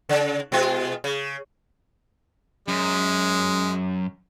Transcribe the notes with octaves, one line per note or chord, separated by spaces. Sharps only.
C#3
B2 G#3 F4
C#3
F#2 G#3